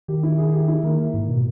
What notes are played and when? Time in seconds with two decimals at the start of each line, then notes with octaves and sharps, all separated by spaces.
0.08 D#3 G4
0.23 E4
0.38 G#4
0.53 G4
0.68 E4
0.83 D#3 A#3
1.14 G#2
1.28 B2